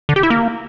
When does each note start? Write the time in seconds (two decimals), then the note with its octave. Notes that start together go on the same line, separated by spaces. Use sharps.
0.09 D3
0.16 G4
0.23 E4
0.30 A#3